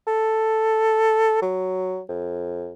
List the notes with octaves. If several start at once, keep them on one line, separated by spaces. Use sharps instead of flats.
A4
F#3
F2